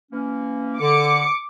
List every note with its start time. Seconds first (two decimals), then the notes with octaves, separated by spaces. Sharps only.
0.12 E3 A#3 C#4
0.80 D3 D6 C#7